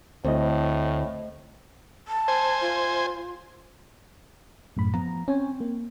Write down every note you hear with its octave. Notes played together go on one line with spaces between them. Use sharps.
D2 A2 C4 E4 C5 D#5
A5
C5 G#5
F4
F#2 A2 B5
F3 B3 A#5
C4 C#4 C#5 G#5
A#3